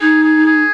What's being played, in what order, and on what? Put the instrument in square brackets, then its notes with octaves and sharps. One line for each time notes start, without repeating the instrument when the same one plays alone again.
[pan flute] D#4 [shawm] G#4
[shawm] G#4
G#4